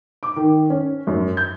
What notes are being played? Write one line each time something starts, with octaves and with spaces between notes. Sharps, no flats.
D6
D#3
C#4
F#2
G6